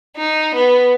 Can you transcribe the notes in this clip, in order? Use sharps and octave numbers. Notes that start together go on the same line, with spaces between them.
D#4
B3